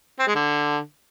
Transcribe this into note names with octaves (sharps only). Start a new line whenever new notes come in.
C4
G#3
D3